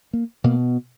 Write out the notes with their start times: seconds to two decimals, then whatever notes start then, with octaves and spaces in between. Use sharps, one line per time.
0.13 A#3
0.44 B2 A#3